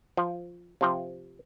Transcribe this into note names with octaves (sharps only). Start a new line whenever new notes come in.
F3
C3 F3 C4